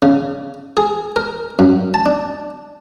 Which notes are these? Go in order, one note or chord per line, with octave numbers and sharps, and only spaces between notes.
C#3
G#4
A#4
F#2
A5
D4